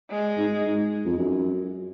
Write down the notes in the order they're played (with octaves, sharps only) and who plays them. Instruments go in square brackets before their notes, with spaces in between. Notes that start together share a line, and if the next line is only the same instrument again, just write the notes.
[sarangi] G#3
[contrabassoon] G#2
G#2
F2
F#2